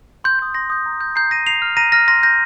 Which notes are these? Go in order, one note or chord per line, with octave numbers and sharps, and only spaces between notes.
C6 G6
D#6 G6
C6 A#6
D#6 G6
A#5
G6
A#5 G6 C7
G6 A#6 D#7
A#5 C7 F7
F6
A#5 A#6 D#7
F6 A#6
C6 A#6
G6 A#6